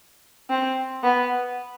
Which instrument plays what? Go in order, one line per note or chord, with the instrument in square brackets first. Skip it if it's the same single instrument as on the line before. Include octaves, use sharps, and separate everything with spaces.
[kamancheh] C4
B3